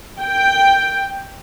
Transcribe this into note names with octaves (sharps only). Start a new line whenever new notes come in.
G5